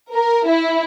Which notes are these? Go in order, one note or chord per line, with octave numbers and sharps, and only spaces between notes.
A#4
E4